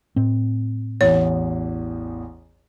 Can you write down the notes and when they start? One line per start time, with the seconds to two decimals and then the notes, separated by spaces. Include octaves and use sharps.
0.16 A2 C4
1.01 A1 E2 C#5